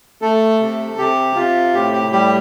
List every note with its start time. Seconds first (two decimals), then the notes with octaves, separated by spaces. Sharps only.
0.22 A3 A4
0.60 C3
0.98 C3 G4
1.35 C3 F4
1.74 A2 G4
1.93 G4
2.12 G3 G4